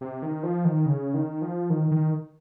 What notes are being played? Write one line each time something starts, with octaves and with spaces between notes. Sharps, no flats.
C3
D#3
F3
D#3
C#3
D#3
F3
D#3
D#3